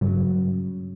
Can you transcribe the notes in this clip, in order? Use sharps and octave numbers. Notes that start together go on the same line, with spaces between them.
G2 C#3 F#3